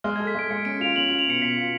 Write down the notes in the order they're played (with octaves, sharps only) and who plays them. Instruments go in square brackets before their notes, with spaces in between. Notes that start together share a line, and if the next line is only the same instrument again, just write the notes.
[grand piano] G#3 [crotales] F6
[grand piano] A4 [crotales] G#6
[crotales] B6
[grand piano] G#3 [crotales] D7
[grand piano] G#3 [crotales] C#7
[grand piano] C#4 [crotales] D7
[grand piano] F4 [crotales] F7
[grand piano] C#4 [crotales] F#7
[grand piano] F4 [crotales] F#7
[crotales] F7
[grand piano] B2 [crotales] C#7
[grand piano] B2 [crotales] B6
[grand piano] F4